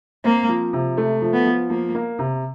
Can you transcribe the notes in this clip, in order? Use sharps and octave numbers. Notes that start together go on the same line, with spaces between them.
A#3 C4
F3
C3
A3
F3
B3
F3
F3 A#3
A#3
C3